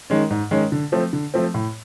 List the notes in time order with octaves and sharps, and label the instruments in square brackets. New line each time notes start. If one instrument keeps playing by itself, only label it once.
[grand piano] D#3 G#3 C#4
G#2
D#3 G#3 C#4
D3
F3 A3 C4
D3
F3 A3 C4
A2